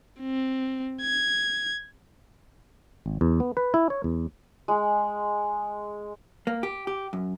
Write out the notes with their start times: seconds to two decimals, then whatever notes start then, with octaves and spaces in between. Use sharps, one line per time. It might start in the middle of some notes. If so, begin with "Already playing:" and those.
0.21 C4
1.02 G#6
3.06 G#1
3.21 E2
3.40 B3
3.57 B4
3.74 E4
3.90 C#5
4.04 E2
4.68 G#3
6.47 A#3
6.63 G4
6.87 G4
7.13 F#2